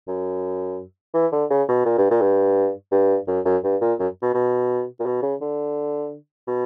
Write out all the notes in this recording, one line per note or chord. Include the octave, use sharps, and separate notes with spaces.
F#2
E3
D3
C#3
B2
A#2
G2
A#2
G2
G2
F#2
F#2
G2
A#2
F#2
B2
B2
A#2
B2
C#3
D3
B2